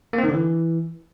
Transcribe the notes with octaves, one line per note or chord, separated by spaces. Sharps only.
A#3
C4
D#3
D3
E3